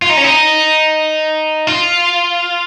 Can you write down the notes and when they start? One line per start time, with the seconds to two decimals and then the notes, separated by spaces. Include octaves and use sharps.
0.02 F4
0.10 D#4
0.17 C#4
0.24 D#4
1.67 F4